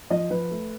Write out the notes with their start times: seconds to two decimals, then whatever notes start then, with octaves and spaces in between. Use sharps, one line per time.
0.10 F3 D#5
0.30 F3 B4
0.50 A3